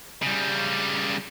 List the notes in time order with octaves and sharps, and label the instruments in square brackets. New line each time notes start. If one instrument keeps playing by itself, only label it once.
[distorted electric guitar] C#3 G3